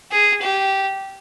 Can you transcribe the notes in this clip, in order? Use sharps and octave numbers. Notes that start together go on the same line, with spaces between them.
G#4
G4